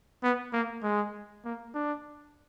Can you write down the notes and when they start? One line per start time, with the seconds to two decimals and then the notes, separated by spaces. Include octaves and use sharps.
0.23 B3
0.53 A#3
0.83 G#3
1.45 A#3
1.74 D4